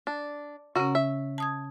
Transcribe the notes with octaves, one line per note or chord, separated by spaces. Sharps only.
D4
C#3 C#4 F#4 A#4
E5
A5 D#6 G#6